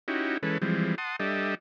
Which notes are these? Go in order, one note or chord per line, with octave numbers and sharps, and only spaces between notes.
C#4 D#4 E4 F#4 G4
E3 G#3 C#4 A4 B4
E3 F3 G3 G#3 C4
F#5 A5 C6 D#6
G3 D4 G4 A4 D#5 E5